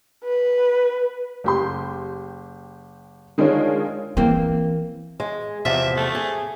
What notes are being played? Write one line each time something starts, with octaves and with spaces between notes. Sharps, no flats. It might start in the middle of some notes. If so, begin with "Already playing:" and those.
B4
F#1 G4 C6
D#3 G#3 D4 D#4 F4 C#5
E3 A#3 C4
G#3
E2 C3 F3 E5
A3
G#4